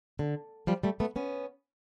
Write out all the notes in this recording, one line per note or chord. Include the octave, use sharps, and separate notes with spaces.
D3
F3 G3
G3 A3
A3 B3
B3 C#4